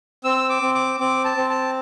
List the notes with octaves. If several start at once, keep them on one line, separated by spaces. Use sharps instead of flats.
C4 E6
D6
C4
D6
C4 D6
A5
C4
A5